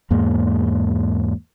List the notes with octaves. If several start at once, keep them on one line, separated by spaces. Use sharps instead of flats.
E2 G#2 A#3